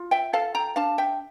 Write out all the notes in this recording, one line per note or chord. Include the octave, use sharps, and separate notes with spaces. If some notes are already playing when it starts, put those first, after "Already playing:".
Already playing: F4
E5 G5
A4 F5 A5
G5 A#5
D4 F5 A5
E5 G5